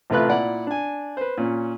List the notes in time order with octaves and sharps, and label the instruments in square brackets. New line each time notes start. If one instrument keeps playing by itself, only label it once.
[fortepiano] A1 C3 A3 F4 B4 F#6
A#2 E4 D5 F#5
D4 G#5
B4 C5
A#2 C#4